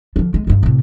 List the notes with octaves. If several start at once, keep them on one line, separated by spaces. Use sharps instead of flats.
D3 F3
G#3
G2 D#3
A2 C3